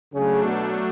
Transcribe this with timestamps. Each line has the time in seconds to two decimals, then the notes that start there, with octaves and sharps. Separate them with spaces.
0.14 C#3 F#3 A3 D4
0.44 B2